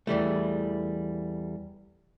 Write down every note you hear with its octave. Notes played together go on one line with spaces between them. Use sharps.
E2 E3 G3 A3